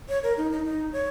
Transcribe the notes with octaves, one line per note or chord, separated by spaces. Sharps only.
C#5
A#4
D#4
D#4
D#4
C#5